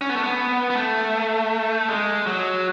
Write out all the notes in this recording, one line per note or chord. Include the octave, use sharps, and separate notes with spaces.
C#4
B3
A3
B3
B3
A3
G#3
F#3